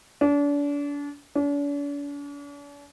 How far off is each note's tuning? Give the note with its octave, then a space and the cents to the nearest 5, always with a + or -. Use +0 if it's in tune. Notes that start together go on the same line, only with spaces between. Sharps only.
D4 -35
D4 -45